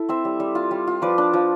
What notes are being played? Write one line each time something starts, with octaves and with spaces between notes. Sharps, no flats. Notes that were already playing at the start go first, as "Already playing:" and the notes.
Already playing: E4 A4
C4 C5 E5
G3
G3
F4
G3
F4
F3 B4 D5
D4
F3